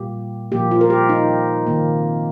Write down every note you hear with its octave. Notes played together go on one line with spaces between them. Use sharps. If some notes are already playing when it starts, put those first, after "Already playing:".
Already playing: A#2 G3 A#3 G4
A#2 F3 A#3 G4
F4
A#4
G4
D#4
C3 D#3 A#3